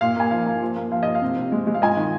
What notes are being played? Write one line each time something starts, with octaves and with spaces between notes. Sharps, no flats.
A#2 F5
A#3 G#5
F3 F5
A#3
F3
A#3
F3 F5
F3 D#5
F5
C3
C3
G#3
G#3
F5
F4 D#5 G#5
D#3